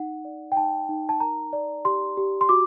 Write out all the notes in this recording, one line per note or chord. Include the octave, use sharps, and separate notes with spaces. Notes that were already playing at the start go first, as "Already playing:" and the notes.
Already playing: D#4 F#5
D5
G5
D#4 A5
D#4
A5
A#4 A#5
D5
G4 C6
G4
C6
F#4 D6